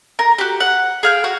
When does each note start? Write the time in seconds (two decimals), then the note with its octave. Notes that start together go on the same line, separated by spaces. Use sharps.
0.19 A#4
0.38 F#4 G4
0.60 F#5
1.03 G#4 F5 G5
1.24 F#4